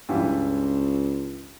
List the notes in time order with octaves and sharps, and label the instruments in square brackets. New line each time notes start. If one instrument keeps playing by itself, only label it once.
[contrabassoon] C#2 [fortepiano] G2 E3